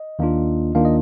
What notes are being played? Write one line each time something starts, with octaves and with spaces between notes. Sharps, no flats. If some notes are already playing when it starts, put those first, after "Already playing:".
Already playing: D#5
D#2 D#3 A#3 D4 F4
D#2 D#3 A#3 D4 F4 F5
D#5